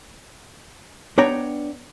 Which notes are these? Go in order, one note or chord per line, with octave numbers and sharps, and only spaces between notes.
B3 D4 C#5 G5 A#5